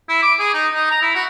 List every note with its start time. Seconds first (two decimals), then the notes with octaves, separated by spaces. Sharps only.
0.09 E4
0.23 D6
0.39 G#4
0.53 D#4
0.73 D#4
0.90 A#5
1.02 E4
1.15 F#4